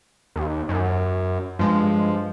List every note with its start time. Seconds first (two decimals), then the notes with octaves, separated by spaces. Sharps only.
0.36 D#2
0.69 F#2
1.59 G2 F3 G#3